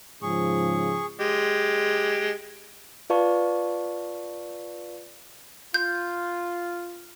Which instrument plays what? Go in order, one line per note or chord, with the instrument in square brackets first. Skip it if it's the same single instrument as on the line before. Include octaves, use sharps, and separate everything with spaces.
[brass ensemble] G#2 C#3 F3 [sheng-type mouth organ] G#4 C#6
[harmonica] G#3 G4
[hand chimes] F4 B4 D5 F5 A5 C#6
[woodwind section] F4 [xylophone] G6